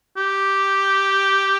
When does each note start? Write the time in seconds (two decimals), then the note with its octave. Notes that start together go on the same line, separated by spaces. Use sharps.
0.17 G4